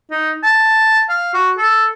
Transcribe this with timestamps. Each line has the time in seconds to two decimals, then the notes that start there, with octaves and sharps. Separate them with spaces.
0.11 D#4
0.43 A5
1.09 F5
1.34 F#4
1.57 A4